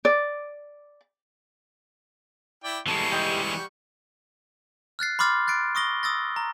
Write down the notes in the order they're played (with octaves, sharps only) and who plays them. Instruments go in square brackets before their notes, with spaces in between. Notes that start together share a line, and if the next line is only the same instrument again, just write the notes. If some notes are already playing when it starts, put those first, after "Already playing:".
[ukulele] D5
[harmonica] E4 D5 G5
[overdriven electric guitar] E3 G#3 [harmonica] G3 C#6 [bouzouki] B3 A4
[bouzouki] D3 D#4 G4
F#4 G4
[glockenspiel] F6 F#6 A6 C7
B5 C6 D6 F6 A6
F#6 A6 C7 D7
C#6 D#6 A#6 G7
D#6 E6 A6 A#6
A#5